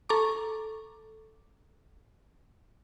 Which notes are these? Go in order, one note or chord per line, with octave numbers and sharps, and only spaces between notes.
A4 A#5 C#6 D6